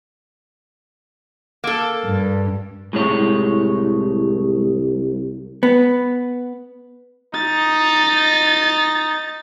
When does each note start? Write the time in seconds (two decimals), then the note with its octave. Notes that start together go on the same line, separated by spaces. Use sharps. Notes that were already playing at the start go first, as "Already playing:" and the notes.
1.64 A#3 A4
2.05 G2
2.93 C2 A2 G#3 C#5
5.63 B3
7.34 D#4 A6